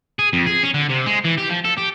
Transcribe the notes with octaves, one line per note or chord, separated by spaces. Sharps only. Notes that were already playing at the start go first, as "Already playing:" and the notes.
G#4
F2
G#4
C#4
D3
C3
G#3
E3
G4
F3
A4
G4